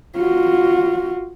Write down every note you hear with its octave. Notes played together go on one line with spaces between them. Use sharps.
F4 F#4